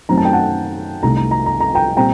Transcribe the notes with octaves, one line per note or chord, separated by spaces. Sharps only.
F#2 D#3 F#3 A3 C4 A#5
A5
G5
F#5 A5
C2 C3 D#3 A3 A#5
A#5
A#5
A#5
A#5
G5 A#5
A#2 G3 C4 G5 A#5